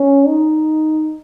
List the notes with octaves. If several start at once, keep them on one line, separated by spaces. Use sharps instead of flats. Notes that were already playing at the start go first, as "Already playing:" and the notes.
Already playing: C#4
D#4